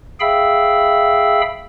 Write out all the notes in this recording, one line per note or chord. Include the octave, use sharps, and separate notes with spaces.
G#4 E5 F5 G5 B5 E6